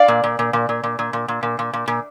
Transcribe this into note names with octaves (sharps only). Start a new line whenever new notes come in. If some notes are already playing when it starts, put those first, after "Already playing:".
Already playing: D5 F5
A#2
A#2
A#2
A#2
A#2
A#2
A#2
A#2
A#2
A#2
A#2
A#2
A#2